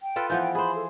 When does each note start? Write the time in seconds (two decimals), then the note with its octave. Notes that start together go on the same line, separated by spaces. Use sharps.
0.02 G5
0.16 F4 A4 B4
0.30 E3 F3 B3 G6
0.41 G5
0.55 G#4 C5 B5
0.76 A4